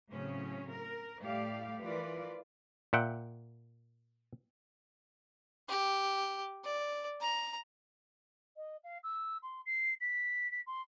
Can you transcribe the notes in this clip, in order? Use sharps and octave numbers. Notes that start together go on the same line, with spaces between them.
A2 C#3 F#3 C4 C#4
A#4
A2 G3 A3 G4 D5 F5
E3 F3 F4 A#4 B4 D5
A#2 E5 F#5 G5
G4
D5
A#5
D#5
F5
E6
C6
C7
B6
B6
C6